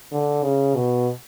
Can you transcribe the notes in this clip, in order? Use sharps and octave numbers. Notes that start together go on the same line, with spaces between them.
D3
C#3
B2